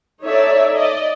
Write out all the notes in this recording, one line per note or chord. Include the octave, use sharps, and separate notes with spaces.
D#4 A4 C#5 D5 E5
D5 D#5